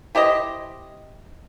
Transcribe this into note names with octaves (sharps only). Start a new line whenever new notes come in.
E4 G4 C5 D#5